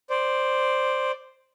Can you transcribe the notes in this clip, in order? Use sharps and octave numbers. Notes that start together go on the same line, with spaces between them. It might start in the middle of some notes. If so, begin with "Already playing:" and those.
C5 D5